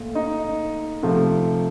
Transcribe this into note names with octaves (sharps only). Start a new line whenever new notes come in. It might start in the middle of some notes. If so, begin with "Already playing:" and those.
Already playing: A#2 A3
D#4 D#5
C3 F3 A3